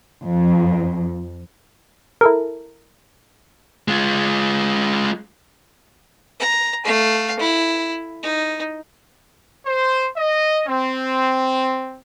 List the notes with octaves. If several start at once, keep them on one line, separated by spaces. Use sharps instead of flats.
F2
E4 A4 A#4
G#3 F4
A#5
A3 F5
E4
D#4
C5
D#5
C4